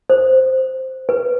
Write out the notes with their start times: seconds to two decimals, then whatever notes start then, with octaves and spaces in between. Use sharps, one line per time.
0.10 C5
1.09 B4